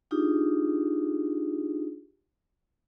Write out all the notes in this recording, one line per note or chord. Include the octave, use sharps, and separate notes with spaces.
D4 D#4 F4 G4 G#4